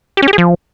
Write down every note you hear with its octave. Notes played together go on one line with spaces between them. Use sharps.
G4
C#4
G4
G#4
F3